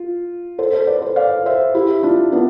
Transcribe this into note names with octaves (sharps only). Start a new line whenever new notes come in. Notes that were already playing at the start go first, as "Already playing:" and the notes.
Already playing: F4
A4 C5
A4 C5
B4 D5
A4 C5
D5 F5
C5 E5
E4 G4
D4 F4
B3 D4